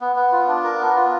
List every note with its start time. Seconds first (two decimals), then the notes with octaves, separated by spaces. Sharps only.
0.01 B3
0.16 B3
0.32 F4
0.47 D4
0.64 A#4
0.79 B3
0.96 F4